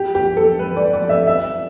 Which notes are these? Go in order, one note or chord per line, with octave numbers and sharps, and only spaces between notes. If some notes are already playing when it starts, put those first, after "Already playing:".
Already playing: G4
G4
A4
B4
D5
D5
E5
E5